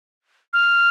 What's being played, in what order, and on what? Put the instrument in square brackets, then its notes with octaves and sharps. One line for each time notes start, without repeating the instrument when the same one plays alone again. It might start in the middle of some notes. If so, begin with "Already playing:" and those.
[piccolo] F6